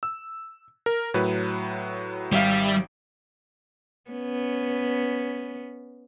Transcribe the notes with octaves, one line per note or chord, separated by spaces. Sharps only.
E6
A#4
A2 F#3 B4
G#1 G3 E5 F5
B3 C#4